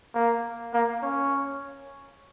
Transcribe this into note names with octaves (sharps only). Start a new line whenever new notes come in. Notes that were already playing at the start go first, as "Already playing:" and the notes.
A#3
A#3
C#4